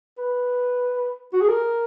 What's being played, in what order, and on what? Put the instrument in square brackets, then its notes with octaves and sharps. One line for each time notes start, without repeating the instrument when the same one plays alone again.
[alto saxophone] B4
F#4
G#4
A#4